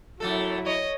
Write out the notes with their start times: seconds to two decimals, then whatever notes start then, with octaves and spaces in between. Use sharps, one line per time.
0.20 F#2 F#3 A3 E4 A4
0.66 C#5 D#5